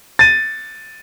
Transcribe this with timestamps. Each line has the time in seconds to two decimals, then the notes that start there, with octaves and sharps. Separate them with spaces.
0.19 A6 D#7